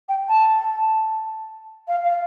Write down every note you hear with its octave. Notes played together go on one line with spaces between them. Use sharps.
G5
A5
F5
F5